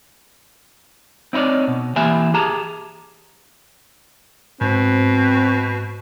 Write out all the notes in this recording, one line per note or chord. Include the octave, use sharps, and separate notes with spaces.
C4 D#4 E4 C#5 D5
B2
E3 A#3 G4 E5 G#5
G4 G#4 A5 A#5
G#2 B2 C4